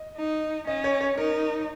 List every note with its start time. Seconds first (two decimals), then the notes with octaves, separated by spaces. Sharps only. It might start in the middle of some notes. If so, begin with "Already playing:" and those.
Already playing: D#5
0.17 D#4
0.67 C#4 D#5
0.84 C#5
1.01 C#5
1.17 D#4 A#4